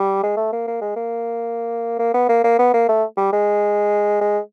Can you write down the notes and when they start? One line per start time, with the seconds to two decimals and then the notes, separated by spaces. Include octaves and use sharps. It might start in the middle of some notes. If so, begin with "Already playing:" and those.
Already playing: G3
0.23 G#3
0.37 A3
0.53 A#3
0.67 A#3
0.81 G#3
0.96 A#3
1.99 A#3
2.14 B3
2.29 A#3
2.44 A#3
2.59 B3
2.74 A#3
2.89 A3
3.17 G3
3.33 G#3
4.21 G#3